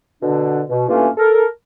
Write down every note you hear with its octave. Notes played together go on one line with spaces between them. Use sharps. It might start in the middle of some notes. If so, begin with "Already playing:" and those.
B2 D3 D4
B2
G2 E3 A3 A#3 C#4 F4
A4 A#4